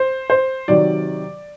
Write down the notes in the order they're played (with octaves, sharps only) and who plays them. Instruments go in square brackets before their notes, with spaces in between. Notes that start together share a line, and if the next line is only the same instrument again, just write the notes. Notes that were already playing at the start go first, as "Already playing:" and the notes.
Already playing: [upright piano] C5
C5
C3 D#3 F#3 D5